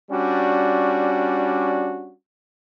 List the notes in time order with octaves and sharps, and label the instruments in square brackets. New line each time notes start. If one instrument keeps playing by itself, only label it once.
[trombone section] G3 C#4 D4 F#4